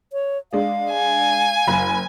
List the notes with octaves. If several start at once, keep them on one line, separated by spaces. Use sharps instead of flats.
C#5
G#3 D4 F5
G#5
F#1 B5